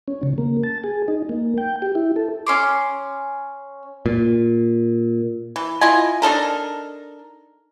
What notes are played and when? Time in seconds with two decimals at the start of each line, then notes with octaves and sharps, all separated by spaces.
0.08 C#4
0.23 C#3
0.38 A#3
0.63 A5
0.84 G#4
1.08 D#4
1.29 A#3
1.58 G5
1.82 G4
1.95 E4
2.16 A4
2.47 C#4 C6 D6
4.06 A#2
5.56 E3
5.81 E4 F4 D#5 G#5
6.22 D4 D#4 A4 A#4